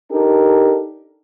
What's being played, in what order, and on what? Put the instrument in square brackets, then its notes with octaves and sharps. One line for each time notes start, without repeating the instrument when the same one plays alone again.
[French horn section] D4 D#4 G4 A4 A#4